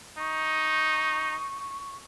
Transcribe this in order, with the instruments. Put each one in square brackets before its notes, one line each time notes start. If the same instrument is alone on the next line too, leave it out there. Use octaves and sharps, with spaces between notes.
[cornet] D#4 [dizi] C#6